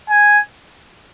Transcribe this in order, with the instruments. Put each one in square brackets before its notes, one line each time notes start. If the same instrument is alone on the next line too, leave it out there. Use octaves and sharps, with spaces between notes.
[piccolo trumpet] G#5